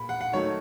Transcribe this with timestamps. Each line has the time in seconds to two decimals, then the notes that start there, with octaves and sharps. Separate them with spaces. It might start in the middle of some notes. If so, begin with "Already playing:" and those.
Already playing: A#2 B5
0.09 F#5
0.21 F#5
0.32 D#3 F#3 A3 C#5